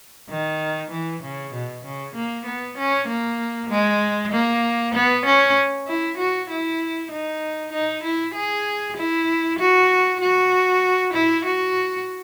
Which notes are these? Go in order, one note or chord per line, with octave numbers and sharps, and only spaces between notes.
D#3
E3
C#3
B2
C#3
A#3
B3
C#4
A#3
G#3
A#3
B3
C#4
E4
F#4
E4
D#4
D#4
E4
G#4
E4
F#4
F#4
E4
F#4